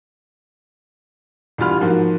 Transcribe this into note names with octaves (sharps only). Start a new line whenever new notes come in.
E1 E3 G3 F4 B5 F6
G#2 F3 A#3 F#4